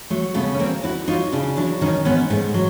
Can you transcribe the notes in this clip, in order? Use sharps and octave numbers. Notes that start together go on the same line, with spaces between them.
F#3 A3
C#3 A3 B3
C#4
D2 A#3 C4
D2 E4 F#4
F#3 D#4 F4
C#3 D4 E4
F#3 D4 E4
D#3 C#4 D#4
G#2 B3 C#4
G#2 A3 B3
F#3